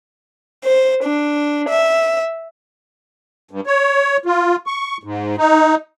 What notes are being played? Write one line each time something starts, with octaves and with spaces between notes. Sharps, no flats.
C5
D4
E5
G2
C#5
F4
C#6
G#2
D#4